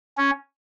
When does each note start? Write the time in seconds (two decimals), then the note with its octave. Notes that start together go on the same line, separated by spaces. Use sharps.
0.17 C#4